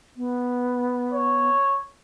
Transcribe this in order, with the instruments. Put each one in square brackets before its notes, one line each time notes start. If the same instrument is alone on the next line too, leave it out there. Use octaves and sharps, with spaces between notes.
[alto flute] B3
[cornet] C#5